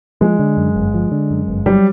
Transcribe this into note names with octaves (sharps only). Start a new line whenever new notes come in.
F3 G#3
D3
F#2
G1
F3
D3
F#2
G1
F#3 G3